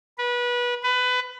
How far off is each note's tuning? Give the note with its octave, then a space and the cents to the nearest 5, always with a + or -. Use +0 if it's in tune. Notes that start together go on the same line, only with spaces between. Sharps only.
B4 -25
B4 +20